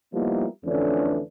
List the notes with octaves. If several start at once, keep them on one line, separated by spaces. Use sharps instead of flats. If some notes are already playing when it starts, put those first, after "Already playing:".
F3 G3 A#3 B3 D#4 E4
F2 D3 E3 A3 C#4 D4